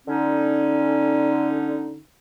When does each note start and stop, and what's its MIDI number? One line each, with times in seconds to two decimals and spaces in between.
0.08 1.98 50
0.08 1.98 61
0.08 1.98 63